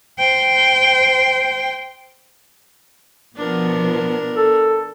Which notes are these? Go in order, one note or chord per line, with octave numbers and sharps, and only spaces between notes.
C5 G5
B2 F3 B3 D4 A#4
A4